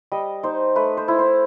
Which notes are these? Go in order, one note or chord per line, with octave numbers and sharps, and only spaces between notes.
G3 D#5
D#4 C5
A3 B4
C5
E4
C5